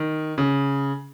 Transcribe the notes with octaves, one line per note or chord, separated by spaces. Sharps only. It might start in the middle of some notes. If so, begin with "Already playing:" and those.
Already playing: D#3
C#3